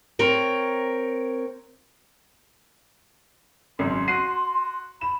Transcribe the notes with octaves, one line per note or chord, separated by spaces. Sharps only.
C4 A#4 C#5
G#1 F#2 C#3 C6
F#4 C7 D#7
B5 E7